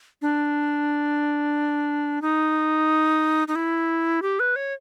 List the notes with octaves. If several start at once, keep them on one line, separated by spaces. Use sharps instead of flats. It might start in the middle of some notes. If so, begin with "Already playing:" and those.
D4
D#4
D#4
E4
G4
B4
C#5